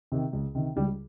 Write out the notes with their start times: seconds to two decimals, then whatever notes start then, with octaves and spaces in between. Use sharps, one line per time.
0.12 C3 D#3
0.33 C#2
0.55 C3 D#3
0.76 C#2 G3